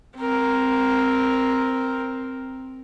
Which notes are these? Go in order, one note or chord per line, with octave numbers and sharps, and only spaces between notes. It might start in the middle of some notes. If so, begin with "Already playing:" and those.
C4 A#4